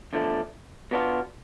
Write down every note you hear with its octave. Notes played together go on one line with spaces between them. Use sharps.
E2 D3 F3 A3 D4
B2 B3 D4 F4